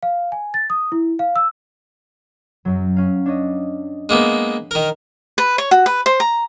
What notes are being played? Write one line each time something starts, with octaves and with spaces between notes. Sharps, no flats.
F5
G#5
A6
D#6
E4
F5
E6
F#2 F#3
C#4 F5
D4 C#5 D#5
G#3 A#3 B3
D#3 A#4
B4
C#5
F#4
B4
C5
A#5